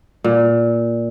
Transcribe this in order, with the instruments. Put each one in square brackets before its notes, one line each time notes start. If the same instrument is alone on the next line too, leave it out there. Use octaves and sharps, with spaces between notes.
[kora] A#2